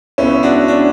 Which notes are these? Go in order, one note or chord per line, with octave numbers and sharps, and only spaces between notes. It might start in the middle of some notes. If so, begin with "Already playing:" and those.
C#2 B2 G#3 B3 C#4 E4
D4 F#4
D4